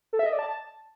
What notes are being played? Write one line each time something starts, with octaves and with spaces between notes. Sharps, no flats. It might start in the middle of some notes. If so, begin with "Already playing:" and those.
A4
E5
D#5
D5
A5